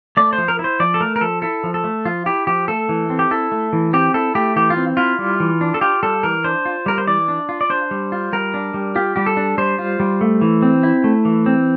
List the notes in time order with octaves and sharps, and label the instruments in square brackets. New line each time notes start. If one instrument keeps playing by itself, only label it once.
[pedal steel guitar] A3 D5
C5
F3
A#4
E4
C5
F3 D5
A4
A3 A#4
A#4
F3 A4
E4 A4
F3
A4
A3
F3 F4
E4 G4
F3 G4
A3 A4
E3
C4
G4
E4 A4
A3
E3
C4 G4
E4 A4
A3 G4
E3 G4
F4
C4
E4 F4
G3
E3
D4
A4
F4 G4
G3 A4
E3 A#4
D4 C5
F4
G3 A#4
C5
E3 D5
D4
F4
D5
D4 C5
G3
F4
G3 A#4
D4
G3
F4 G4
G3 G4
A4
D4
G3 C5
F4
G3
A3
E3
C4
E4
A3
E3
C4